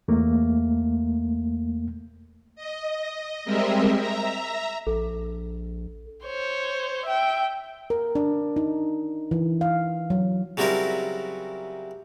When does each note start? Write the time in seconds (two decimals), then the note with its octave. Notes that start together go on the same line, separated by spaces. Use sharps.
0.08 E2 A3 A#3
2.55 D#5
3.44 G3 G#3 C4 A#4 D#5 E5
3.96 E5 A#5
4.87 A#1 A4
6.24 C5 C#5
7.05 E5 G5
7.90 A#4
8.15 D4
8.56 D#4
9.31 E3
9.61 F5
10.10 F#3
10.57 C#3 F#3 G3 C4 E4 A#4